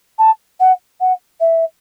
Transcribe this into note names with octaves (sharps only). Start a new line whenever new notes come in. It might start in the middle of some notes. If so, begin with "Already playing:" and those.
A5
F#5
F#5
E5